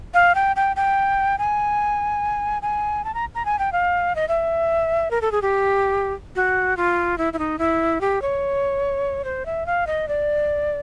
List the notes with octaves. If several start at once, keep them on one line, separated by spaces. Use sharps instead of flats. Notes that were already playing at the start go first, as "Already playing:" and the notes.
F5
G5
G5
G5
G#5
G#5
A5
A#5
A#5
G#5
G5
F5
D#5
E5
A#4
A4
G#4
G4
F#4
F4
E4
E4
D#4
E4
G4
C#5
C5
E5
F5
D#5
D5